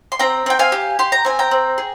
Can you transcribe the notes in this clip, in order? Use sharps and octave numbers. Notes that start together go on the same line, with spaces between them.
C6
C4 G5 A#5
C4 G5
F5 G#5
G4
G4 C6
A#5
C4 G#5
G5 A#5
C4
G#4